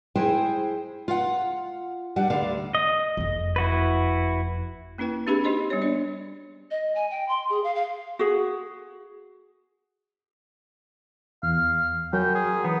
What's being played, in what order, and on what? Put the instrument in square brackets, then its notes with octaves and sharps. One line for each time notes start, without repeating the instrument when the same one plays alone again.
[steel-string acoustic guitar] G#3 E4 G#4 C5 G5
F4 F5 F#5
G3 D4 F#5
D2 D3 D5 F5
[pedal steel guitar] D#5
[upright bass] F#1 F2
[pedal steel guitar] E4 F#4 B4
[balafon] A#3 C#4 E4 B4 G5
C4 D4 G4 G#4 B4 B5
D#4 F#4 C5 D#5 B5 C6
G3 B3 C#5
D4 D5
[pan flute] D#5
G#5
G5
C6
G#4
F5
F5
[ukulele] F#4 G#4
[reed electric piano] E2 [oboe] F5
[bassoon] F#2 [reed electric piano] F#3 [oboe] G5
[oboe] G#4
[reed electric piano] E3 [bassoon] B3